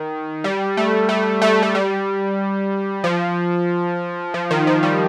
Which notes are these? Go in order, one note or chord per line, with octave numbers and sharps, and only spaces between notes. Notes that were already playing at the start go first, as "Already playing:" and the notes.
Already playing: D#3
G3
A3
A3
A3
A3
G3
F3
F3
D#3
F3
G3